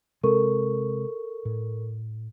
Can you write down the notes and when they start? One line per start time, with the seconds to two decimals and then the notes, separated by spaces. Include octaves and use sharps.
0.24 C3 G#3 C4 A4 A#4 C#6
1.45 A2